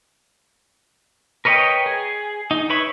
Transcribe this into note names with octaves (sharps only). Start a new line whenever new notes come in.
A#4 B4 C#5 D#5 G5
G#4
D#4
E4 B4 C#5 B5 C#6